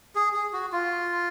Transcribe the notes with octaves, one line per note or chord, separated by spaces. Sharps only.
G#4
G#4
F#4
F4